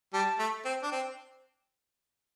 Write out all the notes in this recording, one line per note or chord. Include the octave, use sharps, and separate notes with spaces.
G3 A5
A3
C4
D4
C4